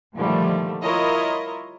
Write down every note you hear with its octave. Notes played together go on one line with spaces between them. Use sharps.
A#2 D3 D#3 F3 G3 A3
E4 F4 A#4 C#5 D#5